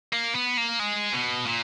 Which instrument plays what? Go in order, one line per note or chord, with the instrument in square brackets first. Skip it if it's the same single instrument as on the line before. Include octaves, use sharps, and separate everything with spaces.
[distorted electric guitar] A#3
B3
A#3
G#3
B2
A#2